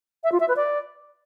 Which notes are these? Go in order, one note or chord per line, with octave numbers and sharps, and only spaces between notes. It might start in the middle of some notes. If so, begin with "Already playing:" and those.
E5
F4
E5
B4
D5